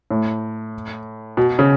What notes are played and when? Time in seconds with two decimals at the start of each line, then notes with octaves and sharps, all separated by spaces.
0.11 A2
1.37 B2
1.59 C#3